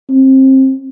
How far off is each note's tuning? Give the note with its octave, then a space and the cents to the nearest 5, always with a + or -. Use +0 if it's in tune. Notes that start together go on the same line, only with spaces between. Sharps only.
C4 +25